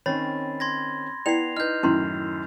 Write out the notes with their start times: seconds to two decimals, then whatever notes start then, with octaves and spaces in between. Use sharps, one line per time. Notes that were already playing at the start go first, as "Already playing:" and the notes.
0.06 D#3 C4 C#4 C#5 B5 A6
0.60 C6 G#6 A#6
1.26 B3 E4 D5 G5 C7 F7
1.57 D#4 B4 F6 G6
1.83 F#2 A2 D#3 C#4 E4 C6